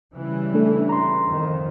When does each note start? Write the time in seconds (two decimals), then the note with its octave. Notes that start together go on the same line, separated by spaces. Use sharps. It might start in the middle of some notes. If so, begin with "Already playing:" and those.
0.14 C#3 E3 G3
0.54 A3 D4 A4
0.89 A#5 C6
1.28 F2 D#3